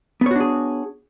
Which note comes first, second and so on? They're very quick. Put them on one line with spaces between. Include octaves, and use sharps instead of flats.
B3 C#5 F#4 D4 G#4